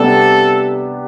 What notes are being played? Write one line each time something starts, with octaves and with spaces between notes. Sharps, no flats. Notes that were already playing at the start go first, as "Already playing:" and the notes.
Already playing: C3 G3 B3 D4 G4 A4